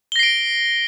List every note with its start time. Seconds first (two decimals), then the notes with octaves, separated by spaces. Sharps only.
0.12 G7
0.16 A#6
0.19 C7
0.23 D7